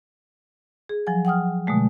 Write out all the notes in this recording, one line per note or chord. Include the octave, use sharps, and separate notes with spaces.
G#4
F3 F#3 G#5
F#5 G5 D#6 F6
B2 D3 G#3 A3